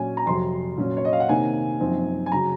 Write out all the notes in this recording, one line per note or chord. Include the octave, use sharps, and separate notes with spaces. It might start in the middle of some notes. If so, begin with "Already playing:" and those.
Already playing: A#2 F#3 C#4 G#5
A#5
F2 C3 F#3 C6
A#2 F#3 C#4
C#5
D#5
F5
F#5
C3 D#3 A#3 D#4 G#5
F#2 F3 C4 D#4
G#5
C#3 F#3 A#5